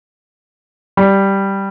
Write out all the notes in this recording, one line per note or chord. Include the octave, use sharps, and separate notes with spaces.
G3